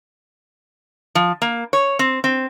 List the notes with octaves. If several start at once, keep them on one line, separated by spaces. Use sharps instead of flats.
F3
A#3
C#5
C4
C4